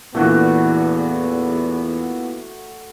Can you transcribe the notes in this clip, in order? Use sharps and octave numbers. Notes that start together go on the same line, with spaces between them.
E2 A#2 E3 A3 B3 D4 F#4